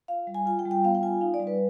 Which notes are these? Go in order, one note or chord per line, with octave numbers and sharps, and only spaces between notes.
F4 F5
G3
G#5
F4 G#5
G5
G3
G5
B3 F5
G5
F4 G#5
D#4 F5
D5
G3
B4